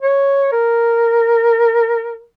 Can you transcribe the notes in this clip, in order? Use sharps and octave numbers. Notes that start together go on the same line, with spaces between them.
C#5
A#4